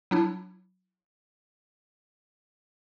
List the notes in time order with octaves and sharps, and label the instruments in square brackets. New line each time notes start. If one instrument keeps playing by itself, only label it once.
[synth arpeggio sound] F#3 D4 E4